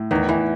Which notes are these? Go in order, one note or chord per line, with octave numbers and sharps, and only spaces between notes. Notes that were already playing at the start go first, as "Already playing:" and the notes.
Already playing: A2
E2 D#3
E2 E3